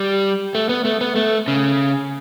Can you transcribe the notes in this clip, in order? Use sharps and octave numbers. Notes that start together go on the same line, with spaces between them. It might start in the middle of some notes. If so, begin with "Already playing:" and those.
Already playing: G3
A3
B3
A3
B3
A3
C#3